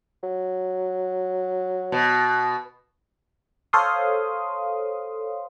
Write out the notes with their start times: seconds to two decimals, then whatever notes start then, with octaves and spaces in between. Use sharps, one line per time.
0.23 F#3
1.92 B2
3.73 A4 C5 C#5 F5 C6 D#6